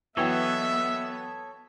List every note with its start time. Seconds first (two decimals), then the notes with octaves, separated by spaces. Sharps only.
0.17 E3 F#3 B3 A4 C#5 D#5 E5 G5